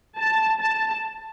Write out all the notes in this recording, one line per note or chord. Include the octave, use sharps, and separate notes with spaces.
A5
A5